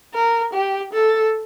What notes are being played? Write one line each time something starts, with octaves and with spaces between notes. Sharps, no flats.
A#4
G4
A4